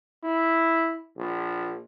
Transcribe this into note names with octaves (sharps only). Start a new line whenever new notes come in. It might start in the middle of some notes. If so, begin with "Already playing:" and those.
E4
A#1